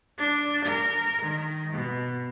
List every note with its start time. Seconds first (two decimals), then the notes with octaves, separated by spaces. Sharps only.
0.18 D4
0.65 A#4
1.22 D#3
1.73 B2